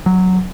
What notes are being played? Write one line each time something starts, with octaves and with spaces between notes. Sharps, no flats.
F#3